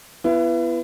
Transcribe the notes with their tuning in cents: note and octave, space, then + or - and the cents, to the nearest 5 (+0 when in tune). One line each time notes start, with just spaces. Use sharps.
B3 +0 E4 +35